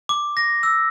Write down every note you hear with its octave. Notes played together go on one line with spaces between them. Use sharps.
D6
A#6
E6